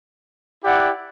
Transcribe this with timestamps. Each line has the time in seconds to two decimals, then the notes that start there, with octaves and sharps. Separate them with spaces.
0.64 E4 G4 D5 F#5